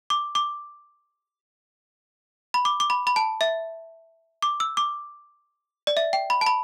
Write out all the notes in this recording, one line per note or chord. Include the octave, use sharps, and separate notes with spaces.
D6
D6
B5
D6
D6
B5
B5
A5
E5
D6
E6
D6
D5
E5
G5
B5
A5
B5